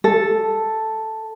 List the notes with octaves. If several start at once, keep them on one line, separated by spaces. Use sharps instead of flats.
A4